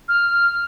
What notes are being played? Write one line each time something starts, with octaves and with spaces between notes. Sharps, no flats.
F6